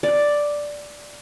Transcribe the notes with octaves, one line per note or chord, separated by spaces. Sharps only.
D5